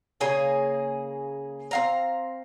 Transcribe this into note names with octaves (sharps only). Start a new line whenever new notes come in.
C#3 A#3 G#4 C#5
C4 F5 A#5